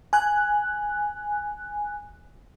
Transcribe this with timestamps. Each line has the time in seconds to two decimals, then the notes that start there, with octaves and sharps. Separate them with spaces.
0.13 G#5 F#6